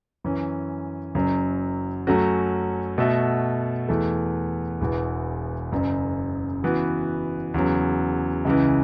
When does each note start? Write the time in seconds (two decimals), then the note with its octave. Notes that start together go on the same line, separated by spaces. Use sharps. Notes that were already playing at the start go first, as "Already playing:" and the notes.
0.24 F#2 E3 C#4
1.15 F#1 F#2 F#3
2.07 F#2 F#3 A3 C#4 F#4
2.98 B2 A3 F#4 A4 E5
3.88 E2 E3 A3
4.81 E1 E2 E3 B3
5.72 F#1 F#2 C#3
6.62 C#3 E3 B3 F#4
7.54 E2 C#3 F#3
8.45 C#2 C#3 E3